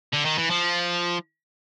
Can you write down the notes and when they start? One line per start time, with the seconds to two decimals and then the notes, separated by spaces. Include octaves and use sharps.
0.13 D3
0.25 D#3
0.38 E3
0.50 F3